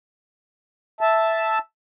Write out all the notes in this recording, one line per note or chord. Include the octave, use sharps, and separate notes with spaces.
E5 A5